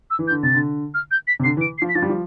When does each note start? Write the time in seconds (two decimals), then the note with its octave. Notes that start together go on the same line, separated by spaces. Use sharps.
0.10 E6
0.19 E3
0.28 G6
0.30 D3
0.43 C3 A6
0.54 D3
0.94 F6
1.11 G6
1.27 B6
1.40 C3
1.44 D3 C7
1.57 E3
1.61 D7
1.78 C7
1.82 F3
1.89 B6
1.95 F3 A6
2.02 G3
2.09 F3